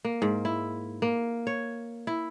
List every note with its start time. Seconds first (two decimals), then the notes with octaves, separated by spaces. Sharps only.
0.05 A#3
0.22 G#2
0.45 E4
1.02 A#3
1.47 C#5
2.07 E4